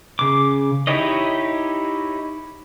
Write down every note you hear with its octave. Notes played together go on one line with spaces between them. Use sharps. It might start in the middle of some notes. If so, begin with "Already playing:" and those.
C#3 D6
D#4 E4 G4 C#5 D#5